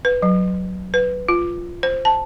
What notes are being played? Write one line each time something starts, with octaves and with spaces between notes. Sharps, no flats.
B4
F#3
B4
F4
C5
A5